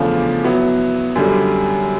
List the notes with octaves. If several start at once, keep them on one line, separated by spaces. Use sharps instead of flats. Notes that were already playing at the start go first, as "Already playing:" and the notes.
Already playing: E2 C#3 F3 A3 D4
F#3 B3 E4
F#2 D3 G3